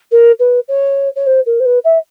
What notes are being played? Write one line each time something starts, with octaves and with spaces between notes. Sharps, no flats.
A#4
B4
C#5
C#5
C5
A#4
C5
B4
E5